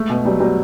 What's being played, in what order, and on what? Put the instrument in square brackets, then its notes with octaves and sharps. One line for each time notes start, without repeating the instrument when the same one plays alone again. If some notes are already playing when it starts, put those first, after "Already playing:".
Already playing: [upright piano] G#3 [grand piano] A3
[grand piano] B2
[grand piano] F#3 [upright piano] G3
[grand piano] F#3 [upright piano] G3